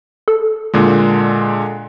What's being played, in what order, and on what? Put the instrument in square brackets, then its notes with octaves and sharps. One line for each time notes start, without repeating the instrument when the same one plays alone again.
[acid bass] A4
[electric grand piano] A#2 D3 G#3